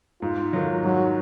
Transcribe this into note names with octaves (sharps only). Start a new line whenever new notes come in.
G#2 F4
D#3 F#3
G#2 F#3